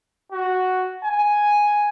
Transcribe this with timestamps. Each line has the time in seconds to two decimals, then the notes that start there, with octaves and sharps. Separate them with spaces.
0.32 F#4
1.04 G#5